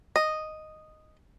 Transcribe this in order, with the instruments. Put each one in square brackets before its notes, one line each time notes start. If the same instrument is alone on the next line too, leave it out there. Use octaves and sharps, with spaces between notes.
[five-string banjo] D#5